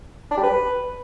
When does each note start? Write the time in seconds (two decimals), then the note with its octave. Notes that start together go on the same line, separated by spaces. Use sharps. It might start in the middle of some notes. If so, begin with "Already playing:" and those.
0.31 D4
0.37 G3
0.44 B4